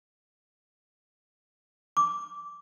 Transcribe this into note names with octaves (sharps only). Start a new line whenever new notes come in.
D6